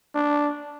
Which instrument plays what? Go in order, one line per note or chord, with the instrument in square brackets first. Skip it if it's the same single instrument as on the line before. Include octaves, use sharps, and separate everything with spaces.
[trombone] D4